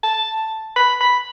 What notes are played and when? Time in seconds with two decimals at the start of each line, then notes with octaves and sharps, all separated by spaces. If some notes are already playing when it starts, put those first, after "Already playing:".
0.03 A5
0.76 B5
1.01 B5